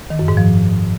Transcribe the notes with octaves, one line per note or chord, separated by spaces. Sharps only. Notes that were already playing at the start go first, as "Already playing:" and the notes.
D#3
F#2
G#2
F3